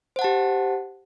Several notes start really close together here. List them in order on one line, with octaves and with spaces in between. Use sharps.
C5 F#5 A5 G4